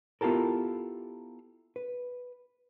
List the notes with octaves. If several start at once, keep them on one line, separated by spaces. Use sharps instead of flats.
B3 E4 F4 G4 A4 A#4
B4